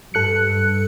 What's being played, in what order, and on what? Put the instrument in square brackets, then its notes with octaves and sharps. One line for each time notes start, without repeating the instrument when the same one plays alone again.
[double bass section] G2 [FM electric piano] A4 F#6 C#7